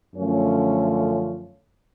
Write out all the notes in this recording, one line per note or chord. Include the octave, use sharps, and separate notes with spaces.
F#2 D3 F3 A3 C#4